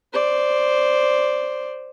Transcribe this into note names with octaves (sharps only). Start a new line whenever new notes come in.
C5 D5